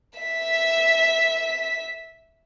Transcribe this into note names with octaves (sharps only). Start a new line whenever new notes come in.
E5 B6